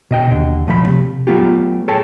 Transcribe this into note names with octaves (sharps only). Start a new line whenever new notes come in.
B2 D#5 G5
D#2 D3
B1 F3 A3 D#5 B5
B1 C3
F#3 A3 B3 F4 G4
G#4 A4 C#5 G5 A5